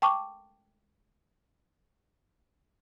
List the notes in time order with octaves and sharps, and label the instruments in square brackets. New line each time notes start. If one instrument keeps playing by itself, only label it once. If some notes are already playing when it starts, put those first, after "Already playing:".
[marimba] G5 A5 C#6 D6